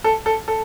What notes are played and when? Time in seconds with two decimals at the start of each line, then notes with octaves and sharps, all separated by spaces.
0.04 A4
0.26 A4
0.48 A4